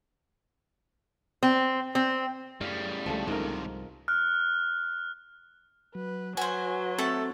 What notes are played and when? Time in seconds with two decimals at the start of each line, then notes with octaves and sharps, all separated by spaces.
1.43 C4
1.95 C4
2.61 F#2 A2 C#3 G3 F5
3.06 C#2 D3 F3 A3
3.27 C2 G#2 C3 D#3 A#4
4.08 F6 F#6
5.95 F#3 B4
6.37 F#3 F#4 B4 C5 G#5
6.98 A3 C4 A4 E5 A5